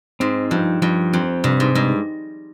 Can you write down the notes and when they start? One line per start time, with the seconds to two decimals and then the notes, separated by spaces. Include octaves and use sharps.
0.20 G#2 C4
0.51 G2 F3
0.82 G2 F3
1.13 F2 C4
1.44 G2 C3
1.60 G#2
1.75 G2 G#3